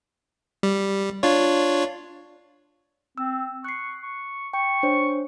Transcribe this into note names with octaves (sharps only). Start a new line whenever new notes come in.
G3
D4 F4 C#5
C4 E6
C#6 F#6 C7
C#6
G5 C#6
D4 C5 C#5